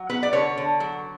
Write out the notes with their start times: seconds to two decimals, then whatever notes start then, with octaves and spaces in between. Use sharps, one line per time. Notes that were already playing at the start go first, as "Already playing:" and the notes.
Already playing: F#3
0.09 B3 B4
0.23 D5
0.33 D3 C#5
0.57 D3
0.80 F#3